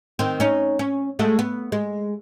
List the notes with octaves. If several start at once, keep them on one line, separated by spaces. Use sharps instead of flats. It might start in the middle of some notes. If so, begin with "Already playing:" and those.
D#3 C4
C#4 D#4
C#4
G#3 A3 F#4
B3
G#3